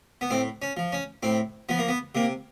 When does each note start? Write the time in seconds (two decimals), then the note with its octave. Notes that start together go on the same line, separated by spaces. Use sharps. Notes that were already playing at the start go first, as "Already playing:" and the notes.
0.21 B3
0.30 A2 C4
0.62 C#4
0.77 F3
0.92 C#4
1.23 A2 C4
1.69 F3 B3
1.78 A#3
1.88 B3
2.15 C3 A#3